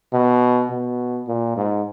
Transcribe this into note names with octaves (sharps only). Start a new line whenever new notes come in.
B2
B2
A#2
G#2